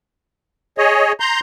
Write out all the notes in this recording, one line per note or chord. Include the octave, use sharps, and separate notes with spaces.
G#4 C#5 D#5
A#5 C6 G6